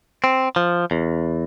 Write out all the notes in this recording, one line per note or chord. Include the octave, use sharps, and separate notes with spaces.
C4
F3
E2